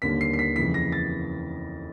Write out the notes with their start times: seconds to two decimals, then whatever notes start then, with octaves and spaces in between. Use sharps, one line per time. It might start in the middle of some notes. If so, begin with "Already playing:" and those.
0.02 D#2 D3 G3 A#3 B6
0.21 C7
0.33 C7
0.39 B6
0.56 F2 C#3 E3 B6
0.74 A#6
0.92 A6